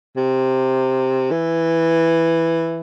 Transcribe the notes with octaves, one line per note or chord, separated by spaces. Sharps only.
C3
E3